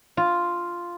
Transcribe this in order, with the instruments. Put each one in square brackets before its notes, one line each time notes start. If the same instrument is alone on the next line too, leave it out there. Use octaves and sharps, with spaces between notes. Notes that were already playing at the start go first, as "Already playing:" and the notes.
[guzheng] F4